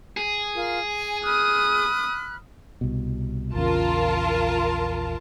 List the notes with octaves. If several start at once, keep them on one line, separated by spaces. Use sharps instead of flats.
G#4
F4 A#4
G#5
B5 D#6 F6 F#6
C2 B2
A#1 E2 C#3 F4 A#4 A5